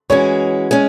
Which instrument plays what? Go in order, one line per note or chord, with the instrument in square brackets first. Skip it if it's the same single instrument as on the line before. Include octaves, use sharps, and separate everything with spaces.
[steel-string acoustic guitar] E3 G#3 C#4 F#4 [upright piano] C#5
[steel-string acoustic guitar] G#3 C#4